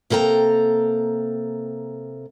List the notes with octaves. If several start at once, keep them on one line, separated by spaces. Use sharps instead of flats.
C3 A#3 A4 G5 A#5